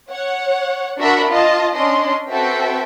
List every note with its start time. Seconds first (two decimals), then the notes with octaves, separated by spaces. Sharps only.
0.11 C#5 F#5
0.99 D4 F#4 A#4 E5 F#5 B5
1.29 F4 D#5 A5
1.76 C#4 D4 D#5 C6
2.29 C4 F#4 A4 B4 E5 G5